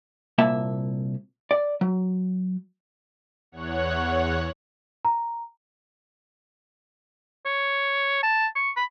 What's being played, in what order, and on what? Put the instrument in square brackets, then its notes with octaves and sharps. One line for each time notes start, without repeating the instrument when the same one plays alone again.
[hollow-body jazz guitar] C2 A#2 A#3 E5 A5
D5
F#3
[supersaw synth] E2 C#5 F#5 F#6
[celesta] A#5
[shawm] C#5
A5
C#6
B5